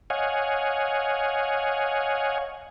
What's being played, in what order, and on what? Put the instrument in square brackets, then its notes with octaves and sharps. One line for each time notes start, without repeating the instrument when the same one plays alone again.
[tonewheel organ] C#5 D#5 F5 F#5 G#5